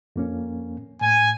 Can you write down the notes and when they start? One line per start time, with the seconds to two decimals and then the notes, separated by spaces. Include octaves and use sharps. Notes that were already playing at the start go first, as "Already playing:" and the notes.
0.16 F2 A#3 C#4
1.01 A2 G#5